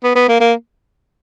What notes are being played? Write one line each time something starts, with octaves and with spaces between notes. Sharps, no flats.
B3
B3
A#3
A#3